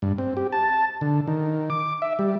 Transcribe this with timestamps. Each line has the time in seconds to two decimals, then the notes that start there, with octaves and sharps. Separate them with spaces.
0.02 G2
0.18 C4
0.37 G4
0.52 A5
1.01 D3
1.27 D#3
1.70 D6
2.02 E5
2.19 G3